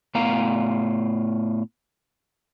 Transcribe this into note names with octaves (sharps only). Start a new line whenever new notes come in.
A2 B3 F5 A#5